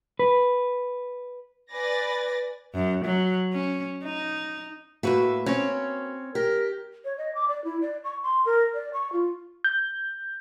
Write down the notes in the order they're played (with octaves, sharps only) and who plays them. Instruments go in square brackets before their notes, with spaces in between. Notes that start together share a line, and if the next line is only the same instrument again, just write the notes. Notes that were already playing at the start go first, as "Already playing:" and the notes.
[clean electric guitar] B4
[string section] B4 D5 G#5 A6 A#6
[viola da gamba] F#2
F#3
C#4
D#4
[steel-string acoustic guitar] A2 E5 [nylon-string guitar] A#3 F#4 B4
[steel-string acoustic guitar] C4 C#5 [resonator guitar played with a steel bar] C#4
[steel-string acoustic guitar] G4 [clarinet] A#4
[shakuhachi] C#5
D#5
D6
D5
E4
D5
C#6
C6
A#4
D5
C#6
F4
[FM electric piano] G6